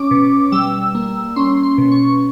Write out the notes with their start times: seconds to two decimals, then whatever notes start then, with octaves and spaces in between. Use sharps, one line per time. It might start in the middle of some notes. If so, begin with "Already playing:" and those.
Already playing: C#4 D6
0.11 B2
0.52 G3 E6
0.95 A#3
1.36 C#4 C6
1.63 C6
1.78 B2
1.92 C#6